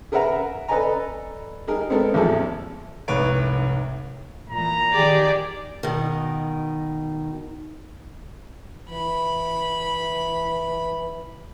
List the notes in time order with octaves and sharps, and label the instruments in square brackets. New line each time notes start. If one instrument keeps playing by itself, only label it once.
[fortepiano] G#4 A#4 B4 E5 F#5 A#5
A4 B4 D5 D#5 G#5 A#5
G3 D#4 G#4 A#4
G#3 B3 C4 D#4 A4 A#4
A1 E2 F3 G#4 A4
[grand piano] F1 C2 G#2 B4 C#5 D7
[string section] A#2 E3 [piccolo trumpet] A#5
[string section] D#3 G4 G#4 [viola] D5
[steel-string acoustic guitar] B2 D#3
[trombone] E3 [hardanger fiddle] B5